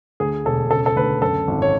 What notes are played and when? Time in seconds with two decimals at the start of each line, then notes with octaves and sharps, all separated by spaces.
0.20 D2 G#4
0.45 E1 A4
0.70 C#3 A4
0.86 A4
0.96 D2 B4
1.22 F#2 A4
1.48 G#1
1.62 C#5